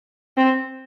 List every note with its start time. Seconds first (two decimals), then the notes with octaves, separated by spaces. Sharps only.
0.37 C4